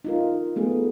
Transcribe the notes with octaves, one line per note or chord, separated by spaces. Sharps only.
D#4 F4 A#4
A3 B3 G#4